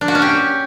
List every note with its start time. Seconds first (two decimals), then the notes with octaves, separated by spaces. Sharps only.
0.01 D4
0.08 F#4
0.15 C#4
0.22 G4